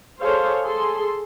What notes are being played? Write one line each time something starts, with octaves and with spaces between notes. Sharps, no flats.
G#4 A4 C5 C#5 F5
G#4 A4 C6